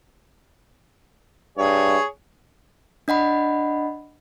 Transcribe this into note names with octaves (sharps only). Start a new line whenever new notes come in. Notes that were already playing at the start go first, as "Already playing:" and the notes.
G2 G#4 C#5
D4 D#5 F#5 B5